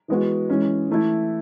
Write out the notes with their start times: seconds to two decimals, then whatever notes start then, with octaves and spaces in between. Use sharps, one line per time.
0.08 E3 G#3 B3 F#4
0.50 E3 G#3 C#4
0.89 E3 A3 E4